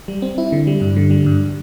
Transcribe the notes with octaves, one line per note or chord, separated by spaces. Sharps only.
G3
C4
E4
D3
G3
G2
D3
G3
G2